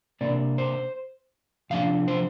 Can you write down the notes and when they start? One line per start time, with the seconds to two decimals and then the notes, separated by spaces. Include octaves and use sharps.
0.21 C3 A#3 D4 D5
0.58 C5
1.70 C3 F3 D4 F5
2.08 C5